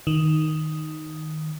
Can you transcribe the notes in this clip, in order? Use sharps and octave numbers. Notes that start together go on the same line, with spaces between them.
D#3